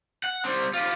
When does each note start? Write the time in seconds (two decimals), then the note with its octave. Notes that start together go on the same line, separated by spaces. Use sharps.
0.24 F#5
0.45 G3 C4
0.73 F4 G4